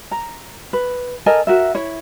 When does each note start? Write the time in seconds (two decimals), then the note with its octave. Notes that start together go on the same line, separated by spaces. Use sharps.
0.12 A#5
0.73 B4
1.26 A4 A#4 D#5 G#5
1.47 F#4 A#4 E5
1.75 E4 C#5